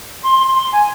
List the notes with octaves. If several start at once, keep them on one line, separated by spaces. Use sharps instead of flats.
C6
C6
C6
G#5